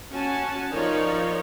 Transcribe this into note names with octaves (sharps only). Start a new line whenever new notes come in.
C#4 F#4 F#5 G#5 A5
F3 D#4 F4 A#4 C#5 D5